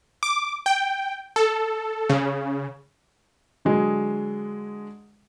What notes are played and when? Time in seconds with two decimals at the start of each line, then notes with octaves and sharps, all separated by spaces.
0.23 D6
0.66 G5
1.36 A4
2.09 C#3
3.65 D3 F#3 G#3 G#4